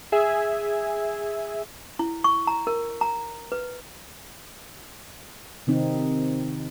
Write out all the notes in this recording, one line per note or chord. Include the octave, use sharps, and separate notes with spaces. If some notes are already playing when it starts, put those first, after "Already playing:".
G#4 E5 G#5
E4
C#6
A#5
A#4
A#5
B4
C3 D#3 C4 D#4